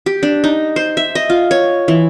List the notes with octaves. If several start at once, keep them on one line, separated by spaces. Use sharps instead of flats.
G4
D4
D#4
C5
E5
D#5
F4
C#5
E3